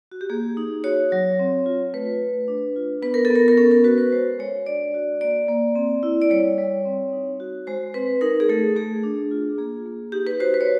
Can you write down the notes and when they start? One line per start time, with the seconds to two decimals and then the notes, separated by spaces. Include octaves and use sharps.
0.12 F#4
0.21 G4
0.30 A#3 G#4
0.57 D#4
0.84 F#4 C#5
1.12 F#3
1.39 C4
1.66 F4
1.94 A3 B4
2.21 A3
2.48 D4
2.76 F4
3.02 B3 B4
3.14 A#4
3.25 A4
3.30 B3
3.35 A#4
3.48 A#4
3.57 C#4 A4
3.71 A#4
3.84 F#4 B4
3.98 B4
4.12 G#3 C5
4.39 G#3 C#5
4.66 D4 D5
4.94 F#4
5.21 A#3 D5
5.48 A#3
5.76 C4
6.03 E4
6.22 D5
6.30 G3 C#5
6.58 G3
6.85 C4
7.12 D#4
7.40 F#4
7.67 G#3 C5
7.94 C4 B4
8.21 D#4 A#4
8.40 G#4
8.49 A3 A4
8.76 A3 G#4
9.03 D4
9.31 F4
9.58 A#3 G#4
9.86 A#3
10.12 D#4 G4
10.27 B4
10.40 F#4 C5
10.54 B4
10.61 C#5